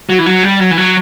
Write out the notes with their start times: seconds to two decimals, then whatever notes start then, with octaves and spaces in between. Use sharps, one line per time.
0.09 F#3
0.19 E3
0.26 F#3
0.43 G3
0.60 F#3
0.71 E3
0.78 F#3